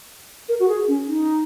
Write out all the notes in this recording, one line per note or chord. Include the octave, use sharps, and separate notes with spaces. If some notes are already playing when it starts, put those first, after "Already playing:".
A#4
F#4
G#4
C#4
D#4